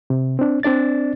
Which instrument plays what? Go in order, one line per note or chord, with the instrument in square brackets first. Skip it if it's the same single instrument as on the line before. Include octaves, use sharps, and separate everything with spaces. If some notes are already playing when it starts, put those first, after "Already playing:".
[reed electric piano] C3
C4 D4
C4 D4 D5 A6